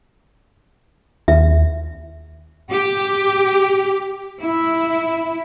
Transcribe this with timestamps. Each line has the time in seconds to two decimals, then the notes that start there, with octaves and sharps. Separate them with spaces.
1.28 D#2 E5
2.70 G4
4.42 E4